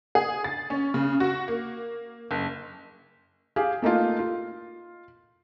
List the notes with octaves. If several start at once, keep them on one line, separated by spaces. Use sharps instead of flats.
G#4
A6
C#4
C#3
F#4
A#3
F#1
G4 G#4 F5
A3 A#3 D#4 F4
F4